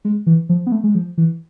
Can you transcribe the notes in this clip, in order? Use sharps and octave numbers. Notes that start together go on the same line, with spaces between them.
G#3
E3
F3
B3
A3
G#3
F3
E3